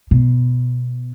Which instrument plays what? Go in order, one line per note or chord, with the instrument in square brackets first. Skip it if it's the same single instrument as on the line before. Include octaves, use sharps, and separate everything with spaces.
[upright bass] B2